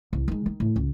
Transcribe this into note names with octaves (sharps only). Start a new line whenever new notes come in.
C2
D#3 G#3
D#3
A2
C#2